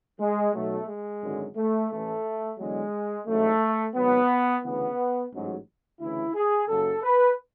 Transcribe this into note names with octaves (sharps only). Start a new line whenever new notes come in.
G#3
B1 B2 F#3 A3
G#3
G#1 F#2 D3 F#3
A3
A1 A2 E3 A3
E2 D3 F#3 G#3
A1 G#2 F#3 A3
G#1 G#2 F#3 B3
D2 C#3 E3 B3
A1 G#2 F#3
D2 C#3 E3 E4
G#4
F#1 F#2 C#3 F#3 A4
B4